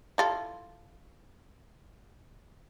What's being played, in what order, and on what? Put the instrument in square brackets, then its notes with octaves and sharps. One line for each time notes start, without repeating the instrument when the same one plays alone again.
[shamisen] E4 F4 A4